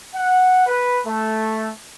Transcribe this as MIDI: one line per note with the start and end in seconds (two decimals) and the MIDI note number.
0.15 0.66 78
0.67 0.99 71
1.06 1.70 57